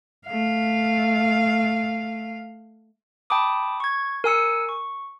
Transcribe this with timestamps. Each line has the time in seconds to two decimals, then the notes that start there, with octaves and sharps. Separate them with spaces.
0.27 A3 F5
3.30 G5 A5 B5 D6 D#6
3.80 C#6 G#6
4.24 A#4 G#5 E6 C#7
4.69 C#6